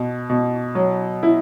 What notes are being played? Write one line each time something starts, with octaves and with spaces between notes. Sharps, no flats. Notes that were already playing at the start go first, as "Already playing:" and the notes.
Already playing: B2
B2
F#3
E4